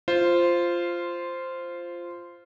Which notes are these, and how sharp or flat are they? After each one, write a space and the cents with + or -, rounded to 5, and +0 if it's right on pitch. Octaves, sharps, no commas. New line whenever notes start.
F4 -10 C5 +0